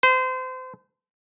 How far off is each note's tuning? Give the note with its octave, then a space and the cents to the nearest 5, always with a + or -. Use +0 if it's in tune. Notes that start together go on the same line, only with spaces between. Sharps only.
C5 -30